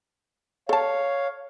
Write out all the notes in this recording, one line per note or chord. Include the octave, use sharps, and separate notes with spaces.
A4 C#5 F5 A5